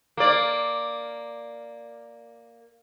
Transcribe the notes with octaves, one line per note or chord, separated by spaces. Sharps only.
A#3 D5